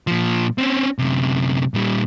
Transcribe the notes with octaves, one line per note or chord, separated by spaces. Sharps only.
A#2 F3
C4 C#4
F#2 C3
A#2 G3